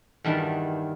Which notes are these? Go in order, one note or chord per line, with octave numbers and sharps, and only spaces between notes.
E2 G2 D#3 G3 A5